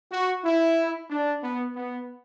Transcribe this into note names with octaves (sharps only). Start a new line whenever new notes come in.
F#4
E4
D4
B3
B3